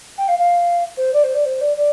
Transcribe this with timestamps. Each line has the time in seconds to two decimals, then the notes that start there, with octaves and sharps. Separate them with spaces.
0.18 G5
0.28 F5
0.39 F5
0.97 C5
1.13 D5
1.24 C5
1.34 D5
1.45 C5
1.61 D5
1.77 D5